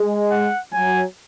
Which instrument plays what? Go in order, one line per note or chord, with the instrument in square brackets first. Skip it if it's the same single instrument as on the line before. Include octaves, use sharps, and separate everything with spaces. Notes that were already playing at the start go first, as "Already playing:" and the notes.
Already playing: [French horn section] G#3
[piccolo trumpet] F#5
[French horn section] F#3 [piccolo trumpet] G#5